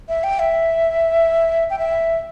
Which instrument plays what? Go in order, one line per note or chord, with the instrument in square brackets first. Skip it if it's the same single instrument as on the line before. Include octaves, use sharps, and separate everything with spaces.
[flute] E5
G5
E5
G5
E5